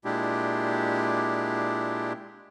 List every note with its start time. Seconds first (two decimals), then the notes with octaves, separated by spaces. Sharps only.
0.05 A#2 G#3 D4 E4 G4